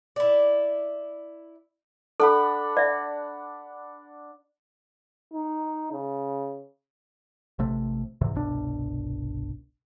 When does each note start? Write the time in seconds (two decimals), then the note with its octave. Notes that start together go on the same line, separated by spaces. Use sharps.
0.16 E4 D5
2.20 D4 A4 F#5 B5
2.77 D5 E5
5.34 D#4
5.92 C#3
7.59 A1 C3 A3
8.21 E2 G#2 C3 E3
8.35 G1 C2 B2 D4